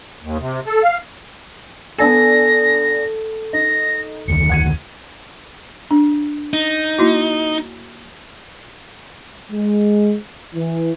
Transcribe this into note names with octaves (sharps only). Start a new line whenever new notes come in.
D#2
C3
A4
F5
B3 D4 A4 G#5 A#6
D#4 A#6
F1 D2 D#3 C#7
F#5 G#6 D#7
D4
D#4
A#3 E4 F#4
G#3
E3